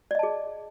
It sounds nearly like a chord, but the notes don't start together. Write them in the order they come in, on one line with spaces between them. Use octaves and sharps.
D5 D#5 A5 G#4